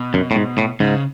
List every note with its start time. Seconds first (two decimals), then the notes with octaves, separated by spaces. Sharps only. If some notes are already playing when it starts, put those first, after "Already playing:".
Already playing: B2
0.14 F#2
0.31 A2
0.36 G#2
0.58 A2
0.80 G#2 C#3